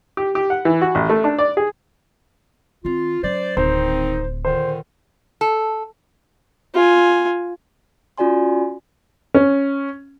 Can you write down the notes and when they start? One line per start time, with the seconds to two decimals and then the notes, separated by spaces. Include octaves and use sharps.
0.17 G4
0.35 G4
0.50 F#5
0.65 E3
0.81 F#4
0.95 A1
1.10 A3
1.24 D4
1.39 D5
1.57 G#4
2.85 D#3 C4 F4
3.23 F#3 C#4 C5 D5
3.57 D1 D#3 C4 D#4 C5
4.45 A#2 D3 D#3 C5
5.41 A4
6.74 F4 G#5
8.18 C#4 F4 F#4 D5 G#5 C6
9.34 C#4